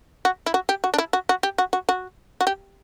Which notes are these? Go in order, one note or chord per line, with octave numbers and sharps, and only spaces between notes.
F#4
E4
F#4
G4
F#4
D4
E4
F#4
F#4
G4
F#4
F#4
F#4
F#4
G4